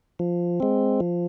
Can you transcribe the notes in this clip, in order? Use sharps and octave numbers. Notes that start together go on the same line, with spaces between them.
F3
G#3 C4
F3